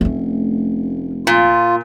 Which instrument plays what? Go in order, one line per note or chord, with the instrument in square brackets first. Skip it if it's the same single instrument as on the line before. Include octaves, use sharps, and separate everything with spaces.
[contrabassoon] F1 [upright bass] A3 C#4
[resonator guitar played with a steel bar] A#2 [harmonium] F4